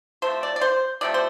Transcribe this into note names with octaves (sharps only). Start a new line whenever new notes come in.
C3 F3 A3 C5
D5
D5
C5
C3 F3 A3 D5
C5